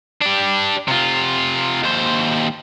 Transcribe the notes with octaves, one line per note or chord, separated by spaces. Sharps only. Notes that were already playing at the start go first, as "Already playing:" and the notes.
D4 G4
C3 F4
D#2 C5